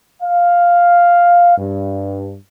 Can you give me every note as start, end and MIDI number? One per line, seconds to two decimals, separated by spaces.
0.22 1.55 77
1.57 2.36 43